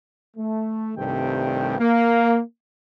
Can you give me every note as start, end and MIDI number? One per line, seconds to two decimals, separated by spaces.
0.37 0.92 57
0.97 1.76 36
0.97 1.76 43
0.97 1.76 48
0.97 1.76 51
0.97 1.76 57
0.97 1.76 79
1.79 2.40 58